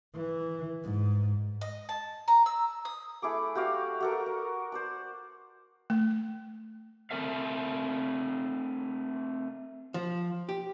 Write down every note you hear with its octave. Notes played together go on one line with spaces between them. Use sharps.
E3
G#2
D#5
A5
A#5
E6
D#6
A3 E4 G#4 D6
F#4 G4 D5 F5
F#4 A4 A#4
A#4
C5 D5 A5
A3
A3 C4 A#4 E5 F5
F3
G4